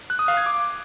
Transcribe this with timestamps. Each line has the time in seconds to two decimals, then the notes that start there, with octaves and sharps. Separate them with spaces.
0.10 F#6
0.19 D#6
0.28 F5
0.37 G#6
0.46 D6